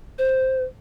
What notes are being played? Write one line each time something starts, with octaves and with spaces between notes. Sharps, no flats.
C5